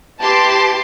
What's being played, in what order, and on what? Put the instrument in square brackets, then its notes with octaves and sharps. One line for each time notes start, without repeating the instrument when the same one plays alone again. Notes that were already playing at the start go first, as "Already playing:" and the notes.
[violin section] E4 G4 B4 A5 C6 D6